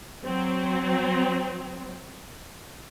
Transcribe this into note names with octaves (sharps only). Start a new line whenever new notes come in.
F#3 C4